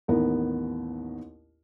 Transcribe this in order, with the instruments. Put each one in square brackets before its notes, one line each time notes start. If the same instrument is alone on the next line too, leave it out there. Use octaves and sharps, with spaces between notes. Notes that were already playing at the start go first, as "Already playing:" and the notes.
[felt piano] A1 D#2 B3 A#4